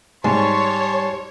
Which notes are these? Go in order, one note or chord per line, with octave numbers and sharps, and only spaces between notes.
G#2 G3 C#5 A5 C6